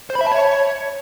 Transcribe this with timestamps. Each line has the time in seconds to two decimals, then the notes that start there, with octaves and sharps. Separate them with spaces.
0.10 C5
0.15 B5
0.21 E5
0.26 A5
0.32 C#5